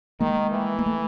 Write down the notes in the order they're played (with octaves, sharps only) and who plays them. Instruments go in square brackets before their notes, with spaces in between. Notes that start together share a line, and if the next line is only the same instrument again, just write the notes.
[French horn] D#3 [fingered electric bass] G#3 A#3
[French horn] E3
[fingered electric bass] A#3
A3